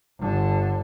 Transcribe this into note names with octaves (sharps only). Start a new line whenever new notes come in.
G1 D3